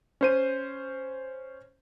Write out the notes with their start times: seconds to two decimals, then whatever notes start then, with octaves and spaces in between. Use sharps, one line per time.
0.21 C#4 C5 D#7